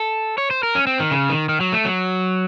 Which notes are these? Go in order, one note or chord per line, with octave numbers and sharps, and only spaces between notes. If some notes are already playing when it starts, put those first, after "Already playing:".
Already playing: A4
C#5
C5
A#4
C#4
C4
D#3
C#3
D#3
D#3
F#3
A3
F#3